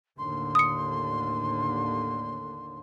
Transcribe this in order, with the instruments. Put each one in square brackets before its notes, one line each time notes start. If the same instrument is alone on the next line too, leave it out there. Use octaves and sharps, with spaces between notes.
[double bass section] D#2 A2 D3 [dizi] C6
[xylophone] D#6 C#7